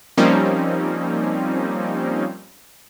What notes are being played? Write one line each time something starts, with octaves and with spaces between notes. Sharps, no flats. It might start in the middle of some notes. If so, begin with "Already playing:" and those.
F3 G3 A#3 C4 C#4 D#4